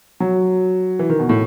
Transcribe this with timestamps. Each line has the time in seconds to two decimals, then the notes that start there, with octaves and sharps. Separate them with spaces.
0.20 F#3
0.99 E3
1.09 D#3
1.19 B2
1.29 A2